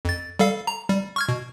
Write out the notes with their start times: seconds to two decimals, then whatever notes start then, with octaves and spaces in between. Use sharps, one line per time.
0.05 F2 A6
0.39 G3 A4 F5
0.67 A#5
0.89 G3
1.16 C#6 F6 G#6
1.28 B2